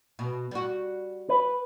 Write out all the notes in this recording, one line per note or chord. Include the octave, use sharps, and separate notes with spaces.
B2
G3 F#4
B4